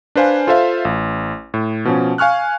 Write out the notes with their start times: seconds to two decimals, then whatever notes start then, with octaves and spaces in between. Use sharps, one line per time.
0.15 D4 B4 C5 F5 G#5
0.47 F4 A4 C5 E5 F5
0.85 A1
1.54 A2
1.85 B2 F3 C#4
2.18 F5 G#5 C#6 F6 F#6